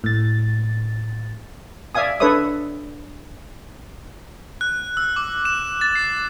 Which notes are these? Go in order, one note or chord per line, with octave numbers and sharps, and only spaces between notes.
A2 A6
D5 E5 F5 G#5 D#6
D4 A4 B4 C#5 E5 D#6
F#6
E6
D6
E7
A6
C7